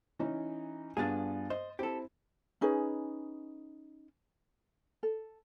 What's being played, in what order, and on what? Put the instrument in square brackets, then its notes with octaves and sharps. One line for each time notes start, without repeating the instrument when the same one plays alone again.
[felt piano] E3 C#4 D#4
[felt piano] G2 B3 A6 [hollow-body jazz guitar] D4 F4 G#4
[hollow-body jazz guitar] C5 [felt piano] D#5
[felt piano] C4 E4 [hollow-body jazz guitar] G4 A4
[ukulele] C#4 D#4 G#4 B4
A4